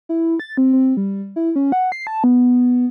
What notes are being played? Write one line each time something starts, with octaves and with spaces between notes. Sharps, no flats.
E4
A6
C4
C4
G3
E4
C#4
F#5
C7
A5
B3